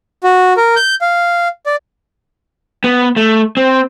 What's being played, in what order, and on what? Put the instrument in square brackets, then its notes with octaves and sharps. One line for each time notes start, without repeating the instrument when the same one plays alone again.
[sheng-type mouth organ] F#4
A#4
G6
F5
D5
[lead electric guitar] B3
A3
C4